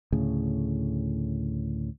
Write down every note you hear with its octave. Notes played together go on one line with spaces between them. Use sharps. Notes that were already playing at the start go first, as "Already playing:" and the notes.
D2 A2 C#3